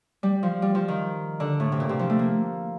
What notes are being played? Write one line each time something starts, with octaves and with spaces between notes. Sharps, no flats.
G3
F3
G3
F3
D#3
D3
A2
C3
A#2
C3
F3
A3
A#3